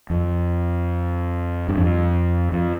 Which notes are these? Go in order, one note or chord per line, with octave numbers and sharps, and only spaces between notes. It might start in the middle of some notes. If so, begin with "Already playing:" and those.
F2
G2
F2
F2